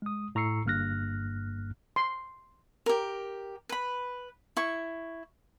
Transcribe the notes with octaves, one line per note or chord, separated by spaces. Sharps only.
G#3 D#6
A2 A#5 C#6 E6 C7 C#7
G1 G2 A#3 F6 F#6 A#6
C6
G4 A#4
B4 B5
E4 C#6